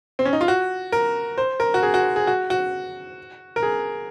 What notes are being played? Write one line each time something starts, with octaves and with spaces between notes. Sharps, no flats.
C4
C#4
D#4
F4
F#4
A#4
C5
A#4
F#4
G#4
F#4
G#4
F#4
F#4
A#4
G#4